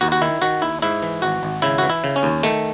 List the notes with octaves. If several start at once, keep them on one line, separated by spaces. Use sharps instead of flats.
D#2 F#4
F#4
D#3 E4
D#3 F#4
D#2 E4
G#2 E4
E3
G#1 F#4
G#1
C#3 E4
E3 F#4
E4
C#3
C#4
D#2
D#3 A3